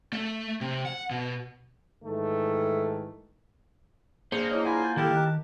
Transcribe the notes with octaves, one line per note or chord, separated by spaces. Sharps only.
A3
C3
F#5
B2
G#2 D#3 E3 A3
A#3 D4 G#4 C5 C#7 F7
E4 C#5 D#5
E4 F4 F#5 G#5 B5
G6 A6
D#3 E4 G4 A4 A#4 A5
D#3 D#5 F#6